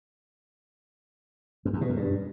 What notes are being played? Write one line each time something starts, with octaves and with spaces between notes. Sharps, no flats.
F#2
E2
B2
F#2
G2